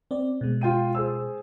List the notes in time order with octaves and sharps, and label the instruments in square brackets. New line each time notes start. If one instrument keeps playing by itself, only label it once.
[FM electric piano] C4 D5
B2 G#3
[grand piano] F4 G5 D#7
G#4 C5 E6